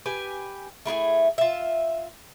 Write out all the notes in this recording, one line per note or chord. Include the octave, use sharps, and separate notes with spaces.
G4 B4 G#5
A3 E4 F4 G#4
F4 E5